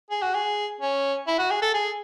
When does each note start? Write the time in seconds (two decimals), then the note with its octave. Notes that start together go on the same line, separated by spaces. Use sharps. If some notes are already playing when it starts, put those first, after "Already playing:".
0.10 G#4
0.22 F#4
0.34 G#4
0.81 C#4
1.27 E4
1.39 F#4
1.50 G#4
1.62 A4
1.74 G#4